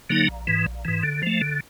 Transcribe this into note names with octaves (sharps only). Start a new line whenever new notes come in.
D3 F#3 A#3 D#4
A#1
G#2 E3
A#1
G#2 E3
D3
F3 A3
D3